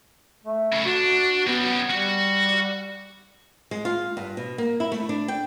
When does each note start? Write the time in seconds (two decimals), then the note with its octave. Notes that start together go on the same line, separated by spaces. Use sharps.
0.44 A3
0.73 C#3 E4
0.85 D4 F#4
1.47 G3 B3 C#4
1.90 G3 F#4 F#5
3.71 G#3
3.85 F4
4.17 G2
4.37 B2
4.58 A#3
4.80 E4
4.92 A3
5.09 D4
5.28 G5